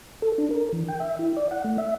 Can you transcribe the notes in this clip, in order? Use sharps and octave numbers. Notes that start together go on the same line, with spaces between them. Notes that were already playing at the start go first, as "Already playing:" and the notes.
A4
D4
A#4
E3
G5
E5
E4
D5
F#5
A3
E5